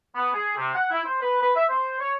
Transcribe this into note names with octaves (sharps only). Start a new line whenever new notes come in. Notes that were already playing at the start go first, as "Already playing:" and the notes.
B3
G#4
C3
F#5
E4
C5
B4
B4
E5
C5
C#5